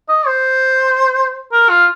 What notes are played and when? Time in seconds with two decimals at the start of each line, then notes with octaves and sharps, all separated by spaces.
0.09 D#5
0.27 C5
1.52 A#4
1.70 F4